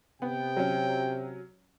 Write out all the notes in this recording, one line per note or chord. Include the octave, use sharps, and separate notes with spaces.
C3 B3 G5
F#3 C#4